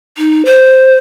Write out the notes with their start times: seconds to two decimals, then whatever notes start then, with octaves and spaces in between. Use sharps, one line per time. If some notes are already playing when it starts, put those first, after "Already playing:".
0.18 D#4
0.45 C5